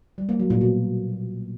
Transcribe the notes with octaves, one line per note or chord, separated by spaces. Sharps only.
G3
A#3
F#3
A#2
B2